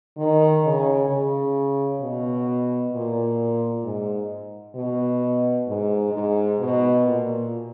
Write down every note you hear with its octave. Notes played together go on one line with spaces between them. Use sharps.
D#3
C#3
C#3
B2
A#2
G#2
B2
G#2
G#2
B2
A#2